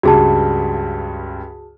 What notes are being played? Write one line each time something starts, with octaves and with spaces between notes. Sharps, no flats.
C#2 G2 F#4 G#4 A5